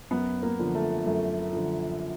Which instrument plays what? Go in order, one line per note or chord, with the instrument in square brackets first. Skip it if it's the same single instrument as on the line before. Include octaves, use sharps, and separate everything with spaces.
[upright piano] F#2 [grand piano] B3
[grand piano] A#3
[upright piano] D3 F3
[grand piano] A3
[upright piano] F#2 [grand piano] A3
[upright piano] D3 F3